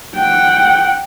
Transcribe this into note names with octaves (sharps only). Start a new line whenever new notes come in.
F#5 G5